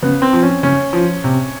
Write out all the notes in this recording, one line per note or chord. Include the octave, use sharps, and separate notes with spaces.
C#3 B3
C4
F3
C#4
C#3 C#4
F3
C3